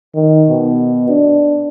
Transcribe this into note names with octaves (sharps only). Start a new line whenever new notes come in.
D#3
B2
D4